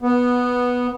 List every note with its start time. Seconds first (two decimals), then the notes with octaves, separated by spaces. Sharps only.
0.02 B3